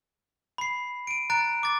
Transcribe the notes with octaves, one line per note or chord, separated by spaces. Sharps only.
B5 C7
D7 D#7
A#5 F#6 A6 D7
D6 A6